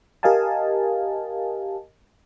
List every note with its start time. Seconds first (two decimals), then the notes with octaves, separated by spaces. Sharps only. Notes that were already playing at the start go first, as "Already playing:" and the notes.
0.23 G4 A#4 D#5 F5 G#5 A5